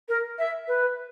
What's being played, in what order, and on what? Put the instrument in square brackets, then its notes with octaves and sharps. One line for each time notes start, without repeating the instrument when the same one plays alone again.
[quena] A#4
E5
B4